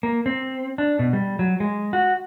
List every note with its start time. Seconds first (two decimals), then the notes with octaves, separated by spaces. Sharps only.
0.03 A#3
0.26 C4
0.78 D4
0.99 B2
1.13 G3
1.39 F#3
1.60 G#3
1.93 F#4